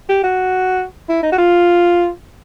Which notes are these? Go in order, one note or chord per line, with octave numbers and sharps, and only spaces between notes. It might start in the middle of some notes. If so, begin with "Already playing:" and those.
G4
F#4
E4
D#4
F#4
F4